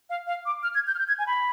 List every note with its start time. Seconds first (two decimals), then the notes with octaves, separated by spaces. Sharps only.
0.10 F5
0.27 F5
0.46 D6
0.63 F6
0.75 G#6
0.87 G6
0.95 F6
0.99 G6
1.08 G#6
1.19 G#5
1.27 B5